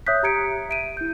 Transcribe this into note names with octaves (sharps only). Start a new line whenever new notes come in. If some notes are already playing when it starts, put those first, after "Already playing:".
C#5 E5 D#6 F#6 G6 B6
G4 A#5 G#6 C#7 D7
E5 D7 D#7
E4 G6